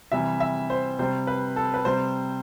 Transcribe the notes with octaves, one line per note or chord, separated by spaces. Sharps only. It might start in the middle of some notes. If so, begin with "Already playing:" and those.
C3 E3 G3 E5
E5
C5
C3 G3 C5
B4
A4
B4
C3 G3 C5